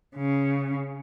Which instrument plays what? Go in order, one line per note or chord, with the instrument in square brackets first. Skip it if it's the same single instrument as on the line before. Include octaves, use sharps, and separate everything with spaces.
[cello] C#3